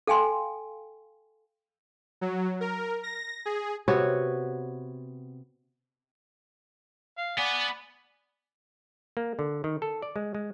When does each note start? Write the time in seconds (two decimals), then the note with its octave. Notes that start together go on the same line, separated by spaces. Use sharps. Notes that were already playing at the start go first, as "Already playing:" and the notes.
0.07 A4 F5 G5 G#5 C6
2.21 F#3
2.61 A#4
3.03 A#6
3.46 G#4
3.88 C3 B3 F#4 C#5
7.17 F5
7.38 B3 D5 F#5 G#5
9.17 A#3
9.39 D3
9.64 D#3
9.82 A4
10.02 D5
10.16 G#3
10.35 G#3